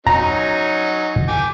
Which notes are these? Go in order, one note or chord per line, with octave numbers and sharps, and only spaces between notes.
F#3 C#4 D#4 A#5
G5 G#5 D6